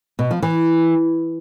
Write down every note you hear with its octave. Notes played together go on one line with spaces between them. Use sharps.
B2
F3
E3